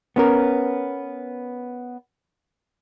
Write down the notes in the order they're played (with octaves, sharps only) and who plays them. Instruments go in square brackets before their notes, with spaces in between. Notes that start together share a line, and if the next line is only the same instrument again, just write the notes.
[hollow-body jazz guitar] B3 C#4 A#4